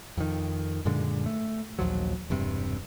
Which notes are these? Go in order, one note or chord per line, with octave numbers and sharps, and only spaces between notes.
F2 D#3
F#2 A#2 D3 G#3
A3
A#1 D#2 F3 F#3
E1 G2 C3